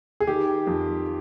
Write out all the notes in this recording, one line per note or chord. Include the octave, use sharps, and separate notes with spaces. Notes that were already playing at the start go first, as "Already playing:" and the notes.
G#4
D#3 G4
F2